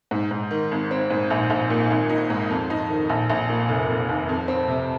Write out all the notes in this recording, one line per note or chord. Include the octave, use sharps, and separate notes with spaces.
G#2
G#2
D#3
G#1
C4
G#2
A#1
A#1
A#2
G#1
D#4
G#2
F2
D#4
D#3
A#1
A#1
A#2
F1
F1
D#2
F2
C4
C3